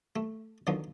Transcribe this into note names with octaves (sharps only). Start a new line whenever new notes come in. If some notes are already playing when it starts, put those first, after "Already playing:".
A3
D3 D#3 F3 F#3 B3